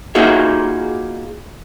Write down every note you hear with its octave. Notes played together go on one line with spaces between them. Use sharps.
A#3 D#4 F4 F#4 G#4 E5